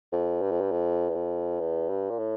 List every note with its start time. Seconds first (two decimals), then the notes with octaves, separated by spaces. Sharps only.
0.13 F2
0.42 G2
0.51 F2
0.61 G2
0.71 F2
1.09 E2
1.15 F2
1.60 E2
1.89 G2
2.10 A#2
2.19 A2